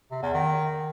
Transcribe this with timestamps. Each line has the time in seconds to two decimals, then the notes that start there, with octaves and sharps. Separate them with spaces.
0.11 C3
0.22 E2
0.34 D#3